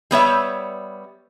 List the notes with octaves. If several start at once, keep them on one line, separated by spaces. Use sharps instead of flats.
G3 B3 C#5 E5